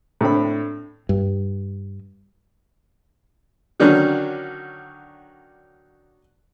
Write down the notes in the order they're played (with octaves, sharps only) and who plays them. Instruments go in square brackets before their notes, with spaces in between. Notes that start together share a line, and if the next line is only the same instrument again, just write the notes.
[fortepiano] A2 C4 D4 B5
[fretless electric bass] G2
[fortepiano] D3 D#3 F#3 C#4 D4